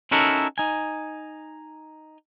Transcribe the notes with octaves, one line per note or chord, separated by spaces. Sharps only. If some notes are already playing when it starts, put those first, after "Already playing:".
C#4 D#4 E4 F#4 A4 A#4
D#4 G#5